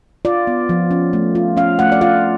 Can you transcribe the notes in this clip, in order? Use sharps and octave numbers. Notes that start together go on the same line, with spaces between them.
F4 D5
B3
F3
C#4
A3
F4
C#4 F5
A3 F#5
D5
F4 F5